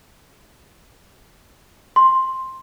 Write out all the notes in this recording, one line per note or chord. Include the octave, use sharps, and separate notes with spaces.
C6